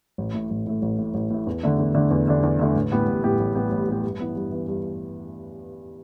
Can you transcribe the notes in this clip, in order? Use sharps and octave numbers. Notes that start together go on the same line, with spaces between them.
A1
A2 A3
A1
A2 A3
A1
A2 A3
A1
A2 A3
E2
D3 A3 D4
E2
D3 A3 D4
E2
D3 A3 D4
E2
D3 A3 D4
A1
A2 G3 B3 G4
A1
A2 G3 B3 G4
A1
A2 G3 B3 G4
A1
A2 G3 B3 G4
G2
E3 B3
G2
E3 B3
G2